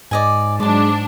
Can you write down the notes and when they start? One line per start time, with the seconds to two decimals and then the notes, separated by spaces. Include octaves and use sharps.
0.11 G#2 D5 D#5 G#5
0.60 G#2 F#3 G#3 D4 D5 A5